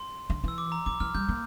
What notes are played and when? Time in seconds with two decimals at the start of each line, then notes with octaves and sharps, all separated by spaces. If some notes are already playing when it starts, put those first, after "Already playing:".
Already playing: C6
0.30 D3
0.44 E3 E6
0.58 D6
0.72 A#5
0.86 E3 D6
1.00 E3 F6
1.15 G3 G6
1.29 A#3